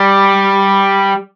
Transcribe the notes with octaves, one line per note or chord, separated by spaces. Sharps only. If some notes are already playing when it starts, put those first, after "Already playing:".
Already playing: G3